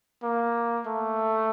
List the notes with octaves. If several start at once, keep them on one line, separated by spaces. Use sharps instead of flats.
A#3
A3